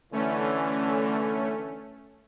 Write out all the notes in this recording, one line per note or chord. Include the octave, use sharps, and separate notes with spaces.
D3 E3 A3 C#4